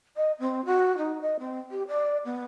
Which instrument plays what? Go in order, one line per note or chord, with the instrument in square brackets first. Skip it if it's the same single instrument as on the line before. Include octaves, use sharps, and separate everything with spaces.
[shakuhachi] D#5
C4
F#4
D#4
D#5
C4
G4
D5
B3